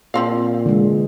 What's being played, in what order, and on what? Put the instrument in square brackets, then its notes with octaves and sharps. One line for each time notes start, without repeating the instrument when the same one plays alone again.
[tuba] A#2 [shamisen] F3 C4 F5
[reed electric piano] D3 [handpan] E3 G#3